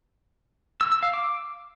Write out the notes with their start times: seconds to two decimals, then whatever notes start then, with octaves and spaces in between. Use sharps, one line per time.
0.81 E6
0.92 E6
1.03 F5
1.13 D6